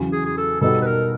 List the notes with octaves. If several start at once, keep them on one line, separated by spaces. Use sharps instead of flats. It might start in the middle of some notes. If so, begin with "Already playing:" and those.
Already playing: E2 C#3 F#3
G#4
G#4
A4
B2 G3 B3 D#4 F#4 A4
B4
A#4